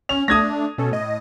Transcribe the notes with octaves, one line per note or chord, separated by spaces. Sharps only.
C#4 F7
A3 D4 D#6 G#6 A#6
B2 C#4 A4
A2 D#5